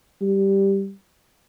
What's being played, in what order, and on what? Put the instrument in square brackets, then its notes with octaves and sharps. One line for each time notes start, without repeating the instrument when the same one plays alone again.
[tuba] G3